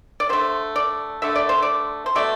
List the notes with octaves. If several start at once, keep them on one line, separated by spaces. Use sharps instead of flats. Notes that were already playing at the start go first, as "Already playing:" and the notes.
D5
D3 A3 C5
D5
D3 A3 E5
D5
C5
D5
C5
B2 A3 D5